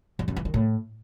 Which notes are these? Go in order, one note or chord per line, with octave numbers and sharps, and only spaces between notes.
F2
F#2
E3
D#3
A2